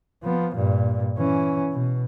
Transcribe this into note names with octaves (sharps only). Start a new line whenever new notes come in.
F3 B3
G2 A#2
E3 C#4
B2